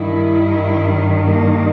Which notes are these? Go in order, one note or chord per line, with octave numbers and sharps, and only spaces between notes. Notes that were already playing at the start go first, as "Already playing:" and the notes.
Already playing: G2 D#3 E4
A#3